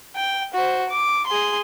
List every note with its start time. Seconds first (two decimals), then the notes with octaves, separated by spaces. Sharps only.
0.16 G5
0.54 F#4 C5
0.89 D6
1.27 G#4 C6